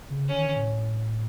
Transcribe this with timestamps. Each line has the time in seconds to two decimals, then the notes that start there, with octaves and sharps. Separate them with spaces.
0.10 C#3
0.28 D3 C#4
0.38 D#3
0.46 D3
0.56 A2